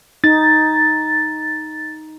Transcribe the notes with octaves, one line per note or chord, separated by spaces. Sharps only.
D#4 A6